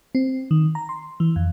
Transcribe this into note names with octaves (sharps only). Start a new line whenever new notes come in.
C4
D#3
A#5
C6
E3
F2